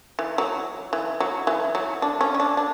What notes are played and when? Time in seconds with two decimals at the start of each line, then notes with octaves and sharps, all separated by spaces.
0.19 E3
0.38 F#3
0.93 E3
1.20 F#3
1.47 E3
1.75 F#3
2.02 D4
2.21 C#4
2.34 C#4
2.40 D4
2.57 D4